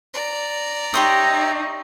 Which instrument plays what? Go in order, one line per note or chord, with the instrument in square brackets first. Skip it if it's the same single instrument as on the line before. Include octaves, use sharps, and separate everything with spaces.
[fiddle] D5 A#5
[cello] D#4 [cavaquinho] G4 C6 D#6 [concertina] C#5 E5 G5